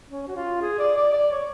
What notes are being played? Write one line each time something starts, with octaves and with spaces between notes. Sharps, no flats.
C#4
F#4
F4
G#4
D5
D5
D5
C#5